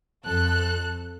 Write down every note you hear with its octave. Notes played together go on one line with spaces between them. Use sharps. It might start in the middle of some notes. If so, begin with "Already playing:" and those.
F2 A4 F#6